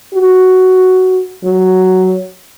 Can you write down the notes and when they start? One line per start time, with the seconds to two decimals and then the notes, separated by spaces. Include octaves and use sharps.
0.14 F#4
1.44 F#3